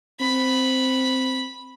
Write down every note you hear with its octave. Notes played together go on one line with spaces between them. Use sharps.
C4 B5